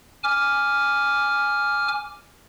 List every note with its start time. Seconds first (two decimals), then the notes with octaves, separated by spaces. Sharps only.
0.24 G#5 D6 F6